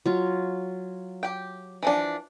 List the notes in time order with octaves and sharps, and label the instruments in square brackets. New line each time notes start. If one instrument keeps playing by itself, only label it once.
[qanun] F#3 F4
[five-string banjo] G4 G5
E3 F3 D4